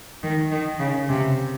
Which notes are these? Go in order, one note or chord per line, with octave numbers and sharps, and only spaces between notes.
D#3
D#3
C#3
C3